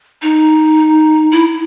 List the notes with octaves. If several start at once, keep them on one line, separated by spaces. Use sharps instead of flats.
D#4
E4